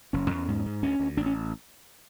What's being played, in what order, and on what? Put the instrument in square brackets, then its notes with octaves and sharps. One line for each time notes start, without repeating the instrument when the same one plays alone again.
[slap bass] F#1 C#4
E2
G#2
G#2
D2 C#4
D2
A1 D4
C#4